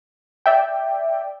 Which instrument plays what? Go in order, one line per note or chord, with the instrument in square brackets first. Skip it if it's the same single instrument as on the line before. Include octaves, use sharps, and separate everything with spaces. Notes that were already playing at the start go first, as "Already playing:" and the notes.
[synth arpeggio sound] D5 E5 G5